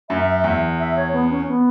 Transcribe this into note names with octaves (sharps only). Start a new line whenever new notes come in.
F#2 E5
E2
E5
C#5
B3
C#4
B3